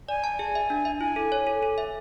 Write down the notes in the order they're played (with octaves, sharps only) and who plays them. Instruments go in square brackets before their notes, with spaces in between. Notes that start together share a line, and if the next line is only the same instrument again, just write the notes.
[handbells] D5 [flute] G#5
[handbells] A5
G#4
E5
D4
E5
[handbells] E4 [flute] G#5
[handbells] A4
C#5
A4
A4
E5